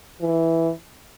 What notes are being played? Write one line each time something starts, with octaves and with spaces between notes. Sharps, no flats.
E3